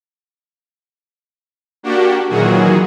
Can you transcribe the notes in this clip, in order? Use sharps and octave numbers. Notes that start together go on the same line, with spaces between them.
A#3 D4 F#4 G4
A#2 D#3 E3 F#3 F#4 G#4